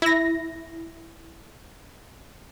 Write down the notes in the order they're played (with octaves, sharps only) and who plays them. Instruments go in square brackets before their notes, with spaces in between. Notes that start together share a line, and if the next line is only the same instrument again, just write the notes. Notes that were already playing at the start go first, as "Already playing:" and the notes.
[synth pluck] E4 A#6